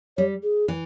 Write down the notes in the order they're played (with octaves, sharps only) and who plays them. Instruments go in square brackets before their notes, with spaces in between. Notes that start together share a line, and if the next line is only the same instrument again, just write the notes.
[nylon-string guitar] G3 [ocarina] C#5
[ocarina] G#4
[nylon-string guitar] E3